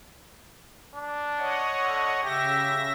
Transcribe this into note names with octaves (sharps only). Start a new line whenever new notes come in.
D4
C#5 D#5 F#5
D3
C#3 G4 E5 A#6